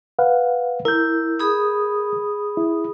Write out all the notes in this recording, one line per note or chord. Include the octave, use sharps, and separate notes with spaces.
B4 F5 F#5
E4 A#4 G6
G#4 B5 D#6
E4